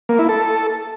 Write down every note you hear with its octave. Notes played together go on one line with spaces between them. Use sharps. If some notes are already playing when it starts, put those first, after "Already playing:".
A#3
E4
A4